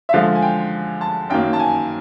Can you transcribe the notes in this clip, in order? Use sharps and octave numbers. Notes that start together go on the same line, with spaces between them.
E5
D3 F3 G#3 F5
G#5
G5
A5
F#2 D#3 F#3 A#3 G5
A5
G#5